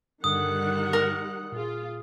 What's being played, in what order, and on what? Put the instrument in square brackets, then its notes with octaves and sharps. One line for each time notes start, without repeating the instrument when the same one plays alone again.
[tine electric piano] G2 D3 [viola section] D#3 G3 F#5 [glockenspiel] D#6
[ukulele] A#4
[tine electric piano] A#2 G#4 [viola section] F4